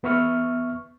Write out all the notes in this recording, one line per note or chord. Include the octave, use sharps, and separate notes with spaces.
E2 B3 E5 C#6 F6